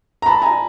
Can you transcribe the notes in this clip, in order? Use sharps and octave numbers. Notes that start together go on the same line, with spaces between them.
A#5
A5 B5
G#5 A#5